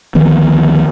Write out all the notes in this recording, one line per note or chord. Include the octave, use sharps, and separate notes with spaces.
D2 D#3 F3 B3